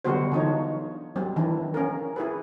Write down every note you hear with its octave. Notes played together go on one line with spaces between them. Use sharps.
D3 F#3 G3 B3 F#4 C5
D3 E3 D4 D#4 F4 C#5
F#3 G3 C4
D#3 E3 D4 E4
C#4 A#4
E4 G#4 B4